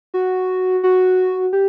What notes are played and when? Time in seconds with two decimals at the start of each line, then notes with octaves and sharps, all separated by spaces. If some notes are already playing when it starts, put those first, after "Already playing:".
0.14 F#4
0.84 F#4
1.53 G4